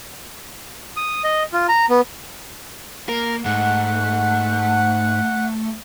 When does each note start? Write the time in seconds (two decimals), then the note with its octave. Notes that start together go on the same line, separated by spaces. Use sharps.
0.97 D#6
1.24 D#5
1.53 F4
1.69 A#5
1.90 B3
3.09 A#3 A#4
3.45 G#2 A3 F#5